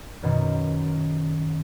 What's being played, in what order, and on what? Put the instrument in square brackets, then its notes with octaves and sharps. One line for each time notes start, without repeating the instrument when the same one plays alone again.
[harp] F#2 B2 D#3